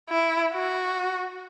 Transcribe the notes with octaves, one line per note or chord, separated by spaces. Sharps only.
E4
F#4